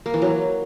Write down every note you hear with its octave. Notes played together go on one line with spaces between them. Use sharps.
A#3
E3
F#3